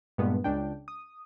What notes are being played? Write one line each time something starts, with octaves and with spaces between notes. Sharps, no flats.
G2 A#2 G#3 B3
C#2 D4 G5
D#6